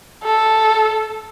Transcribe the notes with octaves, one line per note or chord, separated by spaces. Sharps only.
A4